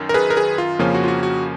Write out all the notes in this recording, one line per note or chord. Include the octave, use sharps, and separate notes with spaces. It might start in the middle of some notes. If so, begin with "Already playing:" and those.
Already playing: F#2 D#3
A#4
G#4 B4
A#4
G#4 B4
F4
F2 C#3 F3 A#3 C#4 F4
F#4
F4
F#4
F#4